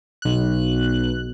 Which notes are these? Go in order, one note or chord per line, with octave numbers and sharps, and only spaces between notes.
B1 F#6